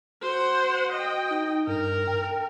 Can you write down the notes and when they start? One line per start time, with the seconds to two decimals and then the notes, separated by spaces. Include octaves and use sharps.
0.22 F#4 C5 F#5
0.93 D#5 G5
1.30 D#4
1.67 G2 A#4
2.07 G5